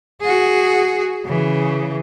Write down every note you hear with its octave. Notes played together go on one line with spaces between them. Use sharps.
F#4 G#4
C#3 E3